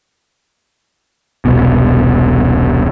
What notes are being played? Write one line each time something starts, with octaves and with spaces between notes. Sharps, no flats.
E1 C2 B2